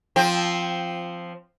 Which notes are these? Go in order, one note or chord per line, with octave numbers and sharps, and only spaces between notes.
F3 C4